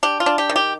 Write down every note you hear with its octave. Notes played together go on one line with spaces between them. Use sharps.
D4 G4
F4
D4
G4
D#3
G4